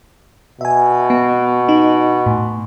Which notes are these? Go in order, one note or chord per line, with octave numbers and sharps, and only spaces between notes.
B2 E5 G#5
B3
D#4
A2